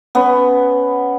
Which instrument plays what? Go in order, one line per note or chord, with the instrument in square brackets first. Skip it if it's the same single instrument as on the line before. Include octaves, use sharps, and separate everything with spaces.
[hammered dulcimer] B3 C#4